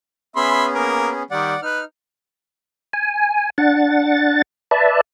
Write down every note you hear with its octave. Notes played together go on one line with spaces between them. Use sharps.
B3 C#4 G#4 E5 B5 C6
A#3 A#4
D#3 G3 D5 F#5
D#4 B4 F6
G#5
D4 F#5 A6
B4 D5 E5 A5